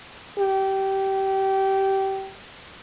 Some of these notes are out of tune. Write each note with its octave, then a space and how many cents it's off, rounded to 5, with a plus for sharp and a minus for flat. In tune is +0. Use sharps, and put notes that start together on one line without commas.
G4 -20